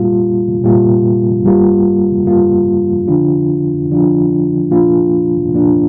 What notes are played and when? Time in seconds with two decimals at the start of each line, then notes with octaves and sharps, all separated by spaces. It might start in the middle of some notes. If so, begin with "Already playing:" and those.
Already playing: A#2 G3 A#3 F4
0.63 A#2 G3 A#3 F4
1.45 G2 G3 A#3 F4
2.26 G2 G3 A#3 F4
3.08 D3 F3 D4 F4
3.90 D3 F3 D4 F4
4.71 A#2 F3 A#3 D4 F4
5.52 A#2 F3 A#3 D4 F4